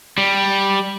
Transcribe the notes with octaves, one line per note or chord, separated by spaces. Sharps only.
G3